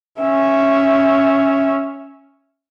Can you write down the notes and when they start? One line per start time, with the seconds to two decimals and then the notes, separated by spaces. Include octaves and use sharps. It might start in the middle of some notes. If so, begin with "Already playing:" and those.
0.20 C#4 E5